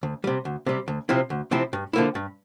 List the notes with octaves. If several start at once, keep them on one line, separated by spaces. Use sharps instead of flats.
D2
C3 G3
D2
C3 G3
D2
C3 F3 C4 E4
D2
C3 F3 C4 E4
G2
D3 F3 A#3 E4
G2